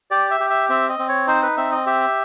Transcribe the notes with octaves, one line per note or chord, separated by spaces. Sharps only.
G4 D5
E5
G4
E5
C4 E5
D#5
C4
C#5
D#4 C5
B4
C4 E5
D#5
G4 E5